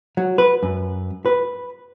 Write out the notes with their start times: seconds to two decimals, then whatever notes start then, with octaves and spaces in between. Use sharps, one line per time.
0.17 F#3
0.38 B4
0.63 F#2
1.26 B4